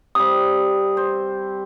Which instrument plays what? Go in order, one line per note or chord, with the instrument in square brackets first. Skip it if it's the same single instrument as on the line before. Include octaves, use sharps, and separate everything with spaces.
[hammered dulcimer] C3 G3 [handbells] D#6
[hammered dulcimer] C5